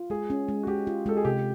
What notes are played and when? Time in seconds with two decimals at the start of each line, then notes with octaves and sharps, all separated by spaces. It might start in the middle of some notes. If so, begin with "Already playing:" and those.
Already playing: F4
0.10 G#3 G#4
0.30 C#4
0.48 G#3
0.63 F#4
0.67 G#3 G4
0.87 F4
1.06 G#3 A4
1.17 G#4
1.25 C3 G4